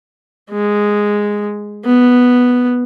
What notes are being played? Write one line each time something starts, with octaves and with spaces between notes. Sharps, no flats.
G#3
B3